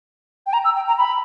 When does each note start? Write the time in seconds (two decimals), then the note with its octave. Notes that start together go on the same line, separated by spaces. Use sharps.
0.46 G5
0.53 A#5
0.64 E6
0.76 G5
0.87 A#5
0.98 B5